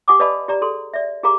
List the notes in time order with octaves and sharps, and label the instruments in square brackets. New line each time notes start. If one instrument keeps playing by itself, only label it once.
[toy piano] G4 F#5 G#5 D6 D#6
B4 D5 D#5 F5 A5 B5
G4 D5 A#5
G#4 A4 C6
D5 E5
G4 G#4 A#4 F5 A#5 D6